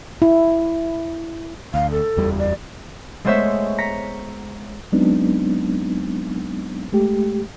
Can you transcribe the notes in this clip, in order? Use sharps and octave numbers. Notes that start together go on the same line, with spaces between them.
E4
D2 F5
A4
F#1 E2 G3
D5
G#3 A3 B3 C5 C#5 E5
A#5 A#6 B6 C#7
F#3 G#3 B3 C4 D4 D#4
G#3 A3 G4